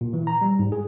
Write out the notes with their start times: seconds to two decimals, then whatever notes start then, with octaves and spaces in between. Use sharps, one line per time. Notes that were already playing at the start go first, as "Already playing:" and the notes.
0.01 A#2
0.13 E3
0.27 A#5
0.41 G3
0.59 G#2
0.72 G#4